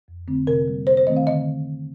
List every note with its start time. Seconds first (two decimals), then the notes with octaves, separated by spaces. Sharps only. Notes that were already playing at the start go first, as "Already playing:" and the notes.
0.08 F2
0.27 D3 A3 C4
0.47 C3 A#4
0.68 G3 A#3
0.87 C3 C5
0.97 C5
1.07 D#3 A3 C4 D#5
1.17 F5
1.26 D3 D#5